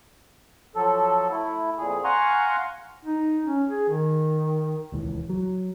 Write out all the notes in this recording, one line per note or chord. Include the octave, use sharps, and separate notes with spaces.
F3 F#3 A4
A3 E4
F2 A#2 G#4
F5 F#5 G#5 A#5 C6 C#6
D#4
C#4
G#4
D#3
D#1 C#2 E3
F#3